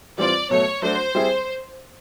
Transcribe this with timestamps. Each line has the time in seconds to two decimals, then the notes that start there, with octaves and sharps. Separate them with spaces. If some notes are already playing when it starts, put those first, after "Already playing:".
0.18 E3 G3 C4 F4 D5
0.50 B2 F#3 A3 C#5
0.82 F#3 A3 D4 F#4 C5
1.15 G3 C4 E4 G#4